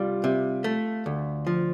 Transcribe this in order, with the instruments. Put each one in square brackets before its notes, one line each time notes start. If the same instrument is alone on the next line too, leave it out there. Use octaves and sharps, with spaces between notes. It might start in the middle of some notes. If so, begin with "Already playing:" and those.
Already playing: [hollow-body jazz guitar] C2 G3 [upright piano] F4
[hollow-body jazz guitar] C3
A3
D2
F3